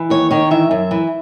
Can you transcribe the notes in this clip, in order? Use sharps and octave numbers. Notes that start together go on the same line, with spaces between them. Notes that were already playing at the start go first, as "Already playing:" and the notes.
Already playing: E3
D#2 C#5
D#3 C#5
E3 E5
F#2
E3